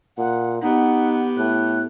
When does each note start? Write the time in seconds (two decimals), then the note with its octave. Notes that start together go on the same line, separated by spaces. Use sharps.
0.18 A#2 F#5
0.62 B3 D#4 G4 F#5
1.37 A2 F#6